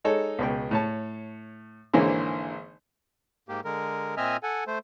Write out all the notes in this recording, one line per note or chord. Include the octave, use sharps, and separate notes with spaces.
G#3 D#4 A4 C#5
C#2 B2 G5
A2 C#5 A5
G#1 D3 E3 A#3 C5 C#5
G#2 A#3 G4
D3 G#3 A#4
A#2 C4 D#5 E5 G#5 F6
A4 F#5 G#5
A3 C5